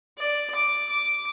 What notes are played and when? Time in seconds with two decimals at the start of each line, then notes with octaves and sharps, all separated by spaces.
0.18 D5
0.55 D6
0.89 D6